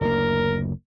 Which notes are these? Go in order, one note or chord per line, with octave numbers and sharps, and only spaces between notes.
F#1 D2 A#3 A#4